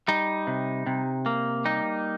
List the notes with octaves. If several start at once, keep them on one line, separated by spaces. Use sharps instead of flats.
G3 D#4
C3
C3
A#3
G3 D#4